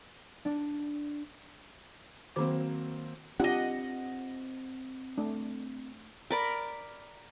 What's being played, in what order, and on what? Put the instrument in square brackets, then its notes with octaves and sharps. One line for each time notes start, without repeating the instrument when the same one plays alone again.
[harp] D4
[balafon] D#3 C5 D6 [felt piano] F#3 A#3 C4
[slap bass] C4 [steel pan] D4 F4 G4 [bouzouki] D#5 F#5
[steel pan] A3 D4
[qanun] A#4 D5 B5